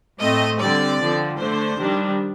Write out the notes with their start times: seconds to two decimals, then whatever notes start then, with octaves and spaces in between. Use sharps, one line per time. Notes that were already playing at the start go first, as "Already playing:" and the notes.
0.20 A2 A3 C4 D#5
0.59 D3 G3 C4 D5
0.99 D3 F3 C4
1.38 D3 A3 D4 C5
1.78 D#3 G3 D4